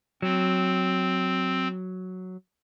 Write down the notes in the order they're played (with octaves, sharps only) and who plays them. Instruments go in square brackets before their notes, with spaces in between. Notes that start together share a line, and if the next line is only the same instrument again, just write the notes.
[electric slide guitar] F#3 [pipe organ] C4